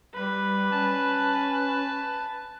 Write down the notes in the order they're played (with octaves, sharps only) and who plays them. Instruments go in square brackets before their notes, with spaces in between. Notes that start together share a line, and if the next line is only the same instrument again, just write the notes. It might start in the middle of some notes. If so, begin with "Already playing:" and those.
[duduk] G3 [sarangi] B4
[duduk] C#4 [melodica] A5